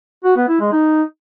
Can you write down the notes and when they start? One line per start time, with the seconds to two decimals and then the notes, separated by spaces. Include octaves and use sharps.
0.24 F#4
0.36 B3
0.48 E4
0.60 G#3
0.72 D#4